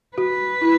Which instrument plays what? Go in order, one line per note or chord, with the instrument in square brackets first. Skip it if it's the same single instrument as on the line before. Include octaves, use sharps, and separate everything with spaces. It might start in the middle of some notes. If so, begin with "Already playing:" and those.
[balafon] F#4 [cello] B4
[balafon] E4